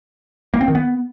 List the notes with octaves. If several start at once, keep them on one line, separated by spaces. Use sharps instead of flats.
A#3
C4
D#3
B3